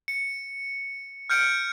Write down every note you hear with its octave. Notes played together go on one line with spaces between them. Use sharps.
C#7
F6 G6 C#7 D7